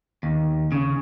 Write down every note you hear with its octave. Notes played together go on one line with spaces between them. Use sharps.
D#2
C#3